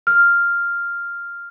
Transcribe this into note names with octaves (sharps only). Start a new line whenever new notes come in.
F6